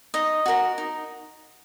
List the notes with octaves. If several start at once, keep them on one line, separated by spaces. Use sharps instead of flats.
D#4 D#5
F#4 A#4 D#5
D#4